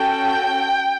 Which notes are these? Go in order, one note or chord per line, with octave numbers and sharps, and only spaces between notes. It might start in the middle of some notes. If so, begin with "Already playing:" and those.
Already playing: C#4 F#4 A4 G5